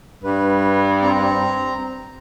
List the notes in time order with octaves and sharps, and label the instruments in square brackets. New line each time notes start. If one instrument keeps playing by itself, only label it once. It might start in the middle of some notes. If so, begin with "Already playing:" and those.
[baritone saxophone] G2 [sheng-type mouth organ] B4
[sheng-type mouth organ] C4 A#5